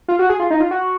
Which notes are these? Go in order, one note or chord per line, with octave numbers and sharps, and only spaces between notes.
F4
F#4
G#4
F4
D#4
F4
F#4